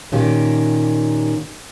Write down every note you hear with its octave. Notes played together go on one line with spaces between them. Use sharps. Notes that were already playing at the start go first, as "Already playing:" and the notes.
A#2 D#3 C#4 G4